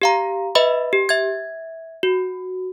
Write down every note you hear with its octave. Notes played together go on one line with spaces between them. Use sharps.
G4 F5 A#5
B4 D#5 E5 B5
G4
E5 G#6
F#4